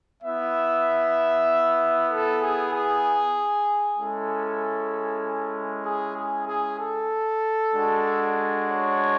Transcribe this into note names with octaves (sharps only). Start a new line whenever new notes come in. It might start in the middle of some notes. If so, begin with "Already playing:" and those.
B3 E4 E5
A4
G#4
G#4
G#3 C#4 E4 A4
G#4
G#4
G#4
A4
G#3 D4 F#4
C#5